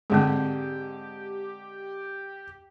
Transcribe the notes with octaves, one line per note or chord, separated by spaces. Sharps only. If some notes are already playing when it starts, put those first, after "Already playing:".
G#2 D3 C4 G4 G#4